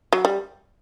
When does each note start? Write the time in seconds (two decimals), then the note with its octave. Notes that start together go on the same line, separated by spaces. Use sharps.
0.13 F#3
0.25 G3